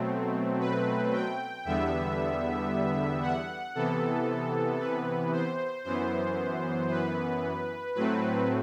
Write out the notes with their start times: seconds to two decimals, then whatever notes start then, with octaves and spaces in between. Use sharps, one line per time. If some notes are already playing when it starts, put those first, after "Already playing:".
Already playing: B2 F#3 A3 C4
0.60 B4
1.13 G5
1.65 E2 D3 G3 B3 E5
3.22 F#5
3.75 C3 E3 B3 A4
4.79 B4
5.32 C5
5.84 F#2 E3 B3 C5
6.90 B4
7.95 A2 F#3 A3 C4 B4